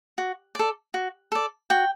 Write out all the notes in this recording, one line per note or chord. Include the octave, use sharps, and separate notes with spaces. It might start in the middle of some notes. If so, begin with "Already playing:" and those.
F#4
A4 D5
F#4
A4 D5
F#4 G5